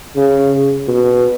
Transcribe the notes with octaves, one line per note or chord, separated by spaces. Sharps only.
C#3
B2